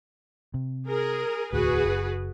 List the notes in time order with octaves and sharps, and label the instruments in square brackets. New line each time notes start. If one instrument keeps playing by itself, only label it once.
[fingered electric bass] C3
[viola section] G#4 A#4
[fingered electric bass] E1 D2 A2 [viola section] F#4 G#4 B4
[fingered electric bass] F#1